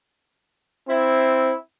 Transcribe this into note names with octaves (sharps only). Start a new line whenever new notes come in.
C4 E4